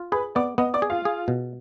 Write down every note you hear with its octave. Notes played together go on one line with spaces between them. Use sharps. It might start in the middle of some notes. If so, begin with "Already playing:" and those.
Already playing: F4
G#4 B4 B5
B3 D5 D6
B3 D#5 D#6
D5 D6
G#4
F4 F5
G#4
B2